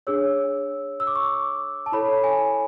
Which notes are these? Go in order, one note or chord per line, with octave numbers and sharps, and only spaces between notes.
D4 G#4 C#5 E6
E6
D6
C#6
D6
A5
E4 A4 C#5 B5
G#5